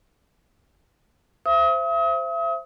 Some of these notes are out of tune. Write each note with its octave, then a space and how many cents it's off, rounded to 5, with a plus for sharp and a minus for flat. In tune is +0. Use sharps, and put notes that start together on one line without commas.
C5 +0 E5 +35 D#6 +40